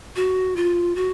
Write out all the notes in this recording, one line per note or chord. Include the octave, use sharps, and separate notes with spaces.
F#4
F4
F#4